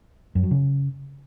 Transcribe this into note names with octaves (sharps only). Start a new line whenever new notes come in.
F#2
F#3
C#3